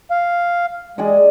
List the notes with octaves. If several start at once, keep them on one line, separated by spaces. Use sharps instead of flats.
F5
G#3 G#4 D5 D#5